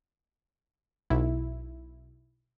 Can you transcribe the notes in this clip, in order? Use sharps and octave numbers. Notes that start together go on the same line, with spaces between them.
B1 E4